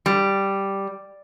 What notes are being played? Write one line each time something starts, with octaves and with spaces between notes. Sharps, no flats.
G3